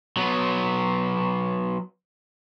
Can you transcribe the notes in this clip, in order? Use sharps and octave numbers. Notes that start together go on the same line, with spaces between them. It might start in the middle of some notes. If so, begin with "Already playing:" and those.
F#3 B3